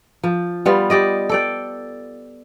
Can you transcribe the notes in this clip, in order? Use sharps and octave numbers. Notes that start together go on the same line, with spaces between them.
F3
G3 B3 F4
G4 D5 D#5
A4 D5 G5